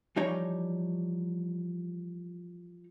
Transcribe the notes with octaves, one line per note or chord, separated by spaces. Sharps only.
E3 F3 G3 D#4 C#5 D5